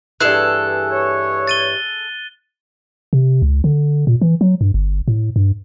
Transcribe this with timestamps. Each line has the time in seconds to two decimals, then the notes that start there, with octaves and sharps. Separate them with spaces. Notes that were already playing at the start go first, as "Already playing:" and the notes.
0.21 G2 E3 G#4 A4 F#6
0.92 C#5
1.47 A6 D#7 G7
3.13 C3
3.42 C#2
3.64 D3
4.07 A#2
4.21 E3
4.41 F#3
4.61 G2
4.74 G1
5.08 A2
5.36 G2